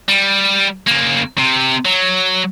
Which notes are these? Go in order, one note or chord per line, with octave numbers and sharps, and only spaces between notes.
G3
C#3 A#3
C3
F#3